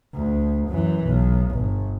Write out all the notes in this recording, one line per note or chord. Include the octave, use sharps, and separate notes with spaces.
D2
F#2 E3
B1
G1